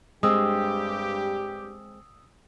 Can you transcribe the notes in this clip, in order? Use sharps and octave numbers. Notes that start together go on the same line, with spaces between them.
G2 G#3 C4 G4 D#6 E6